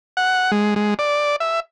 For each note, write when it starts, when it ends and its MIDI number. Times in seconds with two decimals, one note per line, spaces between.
0.17 0.51 78
0.52 0.74 56
0.76 0.94 56
0.99 1.36 74
1.40 1.60 76